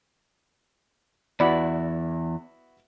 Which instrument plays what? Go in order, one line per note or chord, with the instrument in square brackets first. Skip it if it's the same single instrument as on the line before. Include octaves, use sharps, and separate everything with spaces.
[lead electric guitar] E2 [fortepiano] B3 E4 F#4 [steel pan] D5 B5